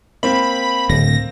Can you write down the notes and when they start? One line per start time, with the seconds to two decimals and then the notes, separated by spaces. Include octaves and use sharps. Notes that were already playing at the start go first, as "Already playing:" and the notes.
0.23 A#3 C4 B5
0.89 D1 A#6